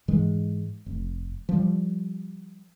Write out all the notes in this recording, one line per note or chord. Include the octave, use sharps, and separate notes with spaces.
G#2 E3 G#3
F1
F3 G3